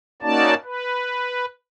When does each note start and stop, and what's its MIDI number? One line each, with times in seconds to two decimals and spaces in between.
0.22 0.54 58
0.22 0.54 61
0.22 0.54 63
0.22 0.54 66
0.22 0.54 74
0.22 0.54 81
0.64 1.45 71